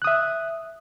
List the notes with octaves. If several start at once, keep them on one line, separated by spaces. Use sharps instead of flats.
E5 D#6 F#6